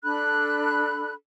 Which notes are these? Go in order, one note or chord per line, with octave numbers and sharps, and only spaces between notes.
D4 A4 B5 F#6